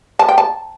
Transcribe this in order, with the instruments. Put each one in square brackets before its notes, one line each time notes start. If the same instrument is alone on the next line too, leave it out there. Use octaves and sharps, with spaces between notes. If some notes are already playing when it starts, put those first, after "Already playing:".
[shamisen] A5
G5
A5